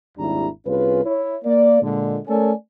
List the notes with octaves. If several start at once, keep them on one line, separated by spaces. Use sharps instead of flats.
G#1 D#2 G3 D4 E4 A#5
C2 C#4 F4 G#4 B4
E4 C#5
A#3 D5
A#2 D3 G#3
A3 C#4 A4 A#4 D5 G#5